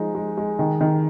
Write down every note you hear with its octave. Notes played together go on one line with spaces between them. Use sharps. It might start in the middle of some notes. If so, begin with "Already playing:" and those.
Already playing: F3 G#3 D#4
G#3
G#3
D#3
D#3